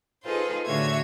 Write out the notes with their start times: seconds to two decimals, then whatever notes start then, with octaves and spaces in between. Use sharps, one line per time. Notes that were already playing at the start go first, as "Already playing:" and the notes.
0.24 D#4 F4 G#4 A4 B4 C5
0.67 A2 D3 F#4 C#5 E5 G#6